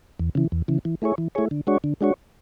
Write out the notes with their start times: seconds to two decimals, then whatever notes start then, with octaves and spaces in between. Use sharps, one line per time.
0.19 E2
0.35 C#3 E3
0.52 E2
0.68 C#3 E3
0.85 E3
1.02 A3 E4 G#4 C#5
1.18 E3
1.35 A3 E4 G#4 C#5
1.51 D3
1.67 G#3 D4 F#4 C#5
1.84 D3
2.01 G#3 D4 F#4 C#5